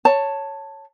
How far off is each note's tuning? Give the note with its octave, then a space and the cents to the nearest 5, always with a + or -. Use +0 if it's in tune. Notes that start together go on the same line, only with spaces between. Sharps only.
C#5 +0 A5 +10